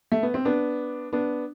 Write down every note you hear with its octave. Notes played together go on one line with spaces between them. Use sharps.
A3
B3
C4
B3 D4
B3 D4